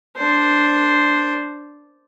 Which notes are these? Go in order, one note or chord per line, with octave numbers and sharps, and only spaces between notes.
D4 C5